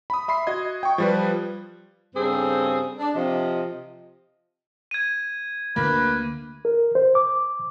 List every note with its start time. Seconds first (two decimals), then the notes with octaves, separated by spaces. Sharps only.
0.10 B5 D#6
0.28 E5 B5 C6 C7
0.47 F#4 D#5 G#6
0.83 G5 C#6
0.98 F3 G3 B4
2.16 G2 C#3 C4 G#4 A4 C5
2.99 D4
3.15 C3 F3 D#5
4.91 G#6 D#7
5.76 D2 A#3 B4
6.65 A#4
6.95 C5
7.15 D6